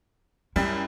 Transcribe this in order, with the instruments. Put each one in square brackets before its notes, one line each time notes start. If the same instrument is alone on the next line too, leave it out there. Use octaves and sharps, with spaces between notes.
[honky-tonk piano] F#2 G3 [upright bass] E4